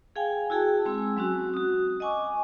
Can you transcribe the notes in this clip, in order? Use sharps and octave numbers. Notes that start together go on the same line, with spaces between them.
G#4 F5 G5 G#5
E4 F#4 G#4 G5 A5
G#3 C4 G#5 E6
F#3 C4 C#4 F#4
F#4 D#6
D#5 F#5 G#5 C#6 D6